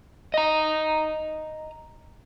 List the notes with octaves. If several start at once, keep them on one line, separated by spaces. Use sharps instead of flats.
D#5 A#5